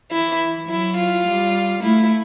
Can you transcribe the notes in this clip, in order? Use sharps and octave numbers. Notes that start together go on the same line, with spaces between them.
E3 E4
F#3 E4
F4
G3
A3 E4